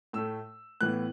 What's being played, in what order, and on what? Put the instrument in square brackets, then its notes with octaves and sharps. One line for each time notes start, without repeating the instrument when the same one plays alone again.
[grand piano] A2 A3 E6
A2 E3 B3 F#6